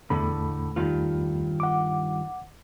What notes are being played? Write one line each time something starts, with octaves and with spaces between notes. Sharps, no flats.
E2 A2 D3 A3 B5
G2 D#3 F4
F#5 D6